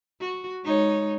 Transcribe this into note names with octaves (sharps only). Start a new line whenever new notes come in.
F#4
G#3 D#4 C#5